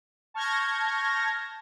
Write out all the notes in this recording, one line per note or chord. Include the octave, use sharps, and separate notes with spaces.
A5 C#6 F6 G6 G#6 A#6